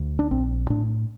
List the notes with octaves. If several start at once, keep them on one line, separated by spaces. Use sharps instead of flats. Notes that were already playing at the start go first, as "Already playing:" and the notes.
Already playing: D2
D4
A#1 C4
A2 D4